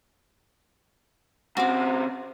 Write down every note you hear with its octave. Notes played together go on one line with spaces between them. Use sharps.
C#3 C4 F#4 D6